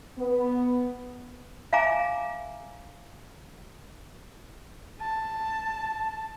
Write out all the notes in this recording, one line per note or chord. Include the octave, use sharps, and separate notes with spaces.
B3
E5 F5 G#5 A#5 D6
A5